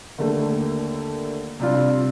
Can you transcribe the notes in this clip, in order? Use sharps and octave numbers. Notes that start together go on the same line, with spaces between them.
D#2 D3 A3
C3 G3 D4 F4